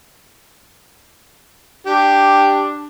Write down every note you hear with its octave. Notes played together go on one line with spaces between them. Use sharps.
D4 G4